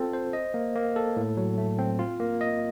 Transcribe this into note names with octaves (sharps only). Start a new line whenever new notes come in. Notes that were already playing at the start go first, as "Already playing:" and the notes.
Already playing: C4 F4 A4
C5
D#5
A#3
A#3
A4
A2
F#3
A3
C4
F4
A#3
D#5